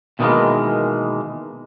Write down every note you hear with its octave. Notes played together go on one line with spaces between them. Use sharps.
B2 D#3 E3 G3 G#3 A#3